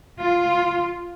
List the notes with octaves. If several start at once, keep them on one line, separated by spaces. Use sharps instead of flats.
F4